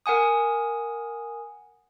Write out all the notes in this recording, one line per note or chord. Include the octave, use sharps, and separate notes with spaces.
A#4 F#5 G#5 D#6